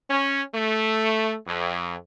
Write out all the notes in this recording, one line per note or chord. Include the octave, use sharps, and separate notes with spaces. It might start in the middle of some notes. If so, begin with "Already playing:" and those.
C#4
A3
F2